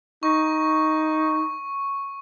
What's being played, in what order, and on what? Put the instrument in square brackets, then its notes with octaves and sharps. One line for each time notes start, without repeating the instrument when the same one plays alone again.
[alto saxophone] D#4 [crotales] C#6